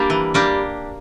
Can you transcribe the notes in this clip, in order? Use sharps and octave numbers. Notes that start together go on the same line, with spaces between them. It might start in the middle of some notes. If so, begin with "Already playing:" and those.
Already playing: G3 A#3 D4 G4
E3
G3 A#3 D4 G4